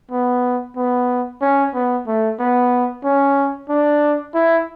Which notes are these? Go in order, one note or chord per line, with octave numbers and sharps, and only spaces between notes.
B3
B3
C#4
B3
A3
B3
C#4
D4
E4